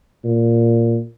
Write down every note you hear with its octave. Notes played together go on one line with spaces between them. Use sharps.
A#2